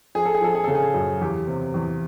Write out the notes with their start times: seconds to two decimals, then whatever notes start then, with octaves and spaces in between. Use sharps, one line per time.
0.15 F3 G#4
0.25 A4
0.35 G#4
0.41 F3 A4
0.55 G#4
0.64 C#3 A4
0.75 G#4
0.94 F#2
1.21 E2 G4
1.48 C3
1.74 E2